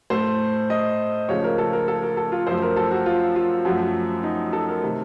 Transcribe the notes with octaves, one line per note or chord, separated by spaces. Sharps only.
A2 A3 C5
D#5
C#2 C#3 F3 A3 C#5
A#4
A4
A#4
A4
A#4
A4
F4
F#2 F3 A3 C5
A#4
A4
F#4
F4
F4
F#2 F3 A3 F#4
D#4
A4
A#4
C3 D#3 A3